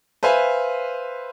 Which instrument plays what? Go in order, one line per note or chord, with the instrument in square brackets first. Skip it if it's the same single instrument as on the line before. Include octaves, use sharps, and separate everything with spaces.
[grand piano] B4 C5 E5 F5 G#5